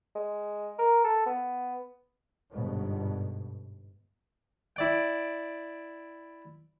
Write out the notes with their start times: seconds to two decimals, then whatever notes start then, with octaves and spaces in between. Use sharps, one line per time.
0.15 G#3
0.79 A#4
1.04 A4
1.26 B3
2.52 G1 G#2 B2
4.76 E4 D5 G5